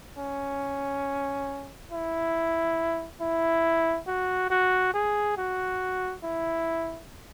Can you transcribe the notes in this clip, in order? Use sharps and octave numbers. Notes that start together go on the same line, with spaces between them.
C#4
E4
E4
F#4
F#4
G#4
F#4
E4